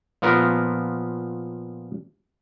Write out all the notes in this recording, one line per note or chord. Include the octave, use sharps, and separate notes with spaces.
A#2 F3 B3 A#4